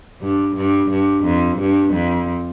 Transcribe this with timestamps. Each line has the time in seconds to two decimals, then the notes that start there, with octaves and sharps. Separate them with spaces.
0.21 G2
0.56 G2
0.90 G2
1.25 F2
1.59 G2
1.93 F2